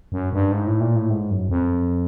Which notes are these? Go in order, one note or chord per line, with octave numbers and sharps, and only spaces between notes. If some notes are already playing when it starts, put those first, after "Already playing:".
F#2
G2
G#2
A2
A#2
A2
G#2
F#2
F2